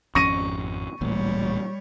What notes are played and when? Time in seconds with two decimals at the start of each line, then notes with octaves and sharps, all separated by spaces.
0.15 G#1 F2 C#4 C#6 A#6 D#7
1.01 D1 A1 A#2 G3 C#5